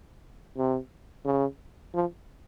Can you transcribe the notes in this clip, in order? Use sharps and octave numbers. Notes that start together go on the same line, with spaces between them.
C3
C#3
F3